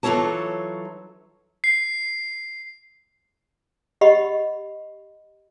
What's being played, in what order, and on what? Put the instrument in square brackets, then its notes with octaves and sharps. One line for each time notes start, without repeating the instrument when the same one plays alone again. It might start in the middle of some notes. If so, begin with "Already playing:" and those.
[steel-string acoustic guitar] E3 F#3 F4 A4 C#5 A5
[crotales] C7
[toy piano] G4 D#5 F#5 B5 C#6